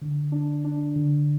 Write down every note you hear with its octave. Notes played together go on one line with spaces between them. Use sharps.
D3
D4
D4
D3